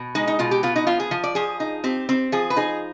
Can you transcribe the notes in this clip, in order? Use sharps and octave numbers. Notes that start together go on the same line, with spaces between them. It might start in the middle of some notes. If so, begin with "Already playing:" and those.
Already playing: B2
G#3 D#4
D#4
B2 F4
G4
B3 F4
D#4
F3 F4
G#4
F3
D5
F3 G#4
D#4
C4 G4
C4
F3 G#4
B4
D#4 G#4